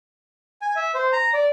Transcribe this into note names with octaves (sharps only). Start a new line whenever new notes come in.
G#5
E5
C5
A#5
D5